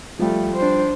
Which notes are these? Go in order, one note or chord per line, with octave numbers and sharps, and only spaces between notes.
F3 G3 A3
D4 C5